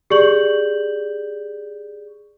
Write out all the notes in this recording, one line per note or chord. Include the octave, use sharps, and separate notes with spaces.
G4 G#4 D5 C#6 G6 F#7